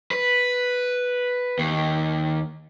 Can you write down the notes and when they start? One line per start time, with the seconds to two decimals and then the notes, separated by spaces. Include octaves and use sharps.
0.11 B4
1.59 D#2